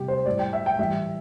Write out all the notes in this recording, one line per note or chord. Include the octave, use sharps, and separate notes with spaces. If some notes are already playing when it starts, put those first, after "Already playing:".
Already playing: C3 G3 G4
C5
A2 G3 D5
G5
E5
G5
A2 E3 G3 E5